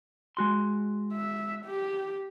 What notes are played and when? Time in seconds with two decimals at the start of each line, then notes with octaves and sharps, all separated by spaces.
0.37 G#3 F#4 C6
1.13 E5
1.66 G4